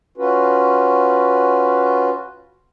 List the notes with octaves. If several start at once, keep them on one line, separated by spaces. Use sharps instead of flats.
C#4 F4 F#4 B4